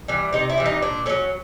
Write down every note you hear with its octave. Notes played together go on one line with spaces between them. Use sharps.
E3 G3
C3 D#4
E4
E3 G3
D#4
A#2 D4
F#3 A3 C#4